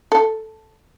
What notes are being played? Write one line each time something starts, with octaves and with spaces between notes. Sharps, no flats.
A4